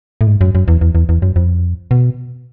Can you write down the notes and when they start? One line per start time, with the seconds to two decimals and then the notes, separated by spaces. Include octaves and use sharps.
0.21 A2
0.27 G#2
0.41 F#2
0.55 F#2
0.68 E2
0.81 E2
0.95 E2
1.09 E2
1.22 F#2
1.36 F2
1.91 B2